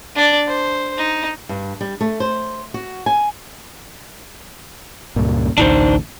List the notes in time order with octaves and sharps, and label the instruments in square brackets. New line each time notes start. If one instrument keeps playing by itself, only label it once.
[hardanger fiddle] D4 D5
C5
D#4
[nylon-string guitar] G2
G3
A3
C5
F#4
G#5
[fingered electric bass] C#2 G2 A#2
[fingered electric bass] A1 D2 [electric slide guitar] D4 D#4 C5